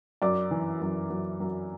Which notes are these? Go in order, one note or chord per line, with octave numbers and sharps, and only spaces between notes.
F#2 D5 D6
E3
F#2
F#2
F#2